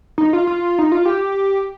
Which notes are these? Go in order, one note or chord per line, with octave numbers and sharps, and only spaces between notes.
D#4
F4
F4
D#4
F4
G4